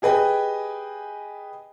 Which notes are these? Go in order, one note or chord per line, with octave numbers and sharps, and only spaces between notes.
G4 G#4 B4 D#5 G5 G#5